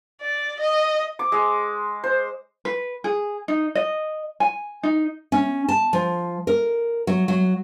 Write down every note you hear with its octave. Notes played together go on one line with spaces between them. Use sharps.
D5
D#5
D6
G#3
C5
B4
G#4
D#4
D#5
G#5
D#4
C#4
A5
F3
A#4
F#3
F#3